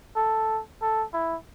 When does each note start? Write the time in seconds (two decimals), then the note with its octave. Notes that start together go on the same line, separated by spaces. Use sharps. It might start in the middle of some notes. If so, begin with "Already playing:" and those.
0.16 A4
0.82 A4
1.13 E4